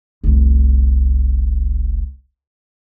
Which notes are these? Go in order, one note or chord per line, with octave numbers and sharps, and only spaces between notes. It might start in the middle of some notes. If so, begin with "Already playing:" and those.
F1 C2